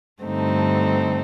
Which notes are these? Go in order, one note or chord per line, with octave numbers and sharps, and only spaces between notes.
G2 D3 A3 C4 D#4